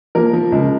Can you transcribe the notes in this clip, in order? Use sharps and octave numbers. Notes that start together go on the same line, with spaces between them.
F3 A#3 A#4
F3
C#2